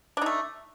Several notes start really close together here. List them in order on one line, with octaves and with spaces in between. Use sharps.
D4 D#4 A3